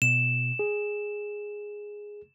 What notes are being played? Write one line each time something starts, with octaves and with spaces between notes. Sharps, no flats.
B2 E7
G#4